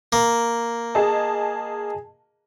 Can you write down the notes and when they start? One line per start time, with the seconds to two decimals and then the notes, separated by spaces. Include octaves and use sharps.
0.13 A#3
0.95 G#4 D#5 A5